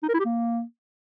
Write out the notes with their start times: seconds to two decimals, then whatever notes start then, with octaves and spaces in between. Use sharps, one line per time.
0.03 D#4
0.09 A#4
0.14 E4
0.20 G4
0.25 A#3